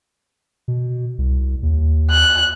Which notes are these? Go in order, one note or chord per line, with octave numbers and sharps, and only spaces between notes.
B2
C2
D#2
F#6